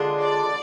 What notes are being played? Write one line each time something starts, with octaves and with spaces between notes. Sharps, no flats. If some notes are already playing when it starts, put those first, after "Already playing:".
Already playing: D3 G#3 D4 F4
D5